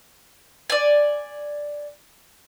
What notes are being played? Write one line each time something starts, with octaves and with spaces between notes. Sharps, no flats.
D5 G#5